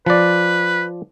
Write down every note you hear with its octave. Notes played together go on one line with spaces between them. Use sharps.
F3 B4 D5